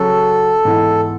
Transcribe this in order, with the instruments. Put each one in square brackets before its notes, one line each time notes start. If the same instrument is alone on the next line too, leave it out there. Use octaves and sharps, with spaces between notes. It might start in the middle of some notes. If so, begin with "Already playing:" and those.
Already playing: [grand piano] C#3 F#3 C#4 F#4 [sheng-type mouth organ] A4
[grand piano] G#2 E3 B3 E4